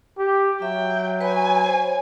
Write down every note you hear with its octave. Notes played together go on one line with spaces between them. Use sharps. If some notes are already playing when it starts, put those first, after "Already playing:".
G4
F#3 E5 G5
B4 C#5 G#5 B5
C5 C#5